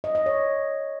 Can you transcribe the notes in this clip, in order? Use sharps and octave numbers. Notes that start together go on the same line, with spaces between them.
D#5
D#5
C#5